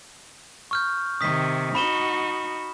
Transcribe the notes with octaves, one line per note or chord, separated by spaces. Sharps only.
C#6 F6 G6
C3 D#3 D#6 B6
D#4 F#4 B5 E7 G7